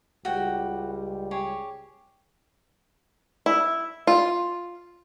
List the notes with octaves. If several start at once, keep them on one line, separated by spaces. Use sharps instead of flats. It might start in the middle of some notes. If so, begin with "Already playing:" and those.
C#2 G3 F#4 G5
G4 G#4 C#5
E4
F4